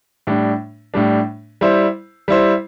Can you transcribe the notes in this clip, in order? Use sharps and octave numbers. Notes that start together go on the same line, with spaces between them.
A2 G3 D4
A2 G3 D4
G3 E4 C5
G3 E4 C5